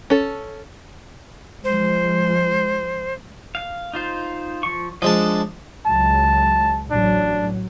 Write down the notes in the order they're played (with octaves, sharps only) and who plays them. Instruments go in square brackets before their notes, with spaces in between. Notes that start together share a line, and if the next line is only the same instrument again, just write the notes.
[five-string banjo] C#4 A4
[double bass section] F3 G#3 [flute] C5
[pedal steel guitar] F5
D#4 F4 C5
F3 C#6
[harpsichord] F3 G#3 A5 [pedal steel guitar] D4 D#5
[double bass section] C#2 F#3 G#3 [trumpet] A5
[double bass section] A1 F#3 [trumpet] D4